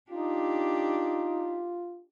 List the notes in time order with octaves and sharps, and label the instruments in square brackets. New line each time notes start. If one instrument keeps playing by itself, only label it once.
[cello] D4 G4 [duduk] D#4 [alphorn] F4